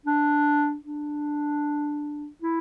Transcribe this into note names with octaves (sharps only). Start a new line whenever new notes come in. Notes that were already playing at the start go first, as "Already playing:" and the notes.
D4
D4
E4